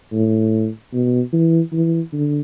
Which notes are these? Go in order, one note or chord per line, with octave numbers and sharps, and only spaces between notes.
A2
B2
E3
E3
D3